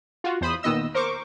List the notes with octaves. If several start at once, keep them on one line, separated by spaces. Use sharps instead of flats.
F4 F#4
E2 C5 B5 D#6
A#2 D#3 B3 D#5 E6
A#4 C5 C#6 D6